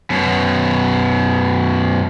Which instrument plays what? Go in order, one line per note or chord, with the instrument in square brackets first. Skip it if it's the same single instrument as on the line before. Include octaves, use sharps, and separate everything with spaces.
[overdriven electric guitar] F#2 B2